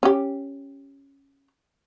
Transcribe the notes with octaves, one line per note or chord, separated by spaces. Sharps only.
C#4 G4